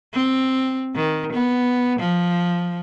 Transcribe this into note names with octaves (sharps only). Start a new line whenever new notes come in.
C4
D#3
B3
F3